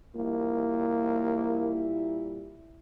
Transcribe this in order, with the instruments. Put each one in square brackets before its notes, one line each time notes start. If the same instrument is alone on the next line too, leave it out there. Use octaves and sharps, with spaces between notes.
[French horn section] A#2 G3 E4 [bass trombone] A#3